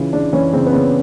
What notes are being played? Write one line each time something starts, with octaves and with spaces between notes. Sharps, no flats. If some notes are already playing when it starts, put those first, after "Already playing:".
Already playing: C#3 E3 F4
C#3 D4
E3 C#4
C#3 C4
B3
C#3 C4